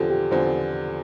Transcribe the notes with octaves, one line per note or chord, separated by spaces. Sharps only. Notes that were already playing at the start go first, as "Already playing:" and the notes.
Already playing: E2 D3 F3 C4 F4 G4 A4
G4
E2 D3 F3 C4 C5